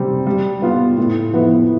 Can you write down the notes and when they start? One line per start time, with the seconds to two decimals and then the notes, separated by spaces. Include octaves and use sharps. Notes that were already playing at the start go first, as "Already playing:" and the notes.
Already playing: C3 G3 C4
0.27 G3
0.62 B3 F4
0.98 A2
1.33 F3 B3 E4 B4